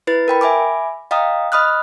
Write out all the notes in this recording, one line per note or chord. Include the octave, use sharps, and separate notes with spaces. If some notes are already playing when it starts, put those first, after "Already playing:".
E4 B4 A6
A#4 G5 B5
E5 G#5 B5 D6
D#5 F5 G5 A#5 D#6
D#5 B5 D#6 F6 F#6